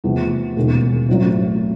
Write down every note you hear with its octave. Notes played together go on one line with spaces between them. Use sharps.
E2 C3 F3 A3
E1 D#2 C#3
A1 A2 F#3 A3 C4